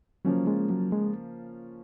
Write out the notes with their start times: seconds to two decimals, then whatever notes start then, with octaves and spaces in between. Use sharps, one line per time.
0.25 C#3 F3 F#3 A#3 C#4
0.47 G#3
0.70 F#3
0.92 G#3